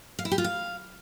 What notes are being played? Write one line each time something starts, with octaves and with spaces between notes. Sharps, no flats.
F5
E4
G4
F4
F5